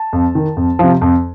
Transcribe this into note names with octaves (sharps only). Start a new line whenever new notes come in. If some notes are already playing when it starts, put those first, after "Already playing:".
Already playing: A5
F2
D#3
F2
C3 F3
F2